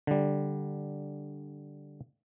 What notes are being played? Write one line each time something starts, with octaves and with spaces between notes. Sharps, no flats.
D3 G3